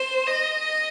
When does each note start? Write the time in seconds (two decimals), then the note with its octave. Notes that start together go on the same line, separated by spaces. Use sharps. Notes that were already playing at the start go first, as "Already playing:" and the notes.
Already playing: C5
0.26 D#5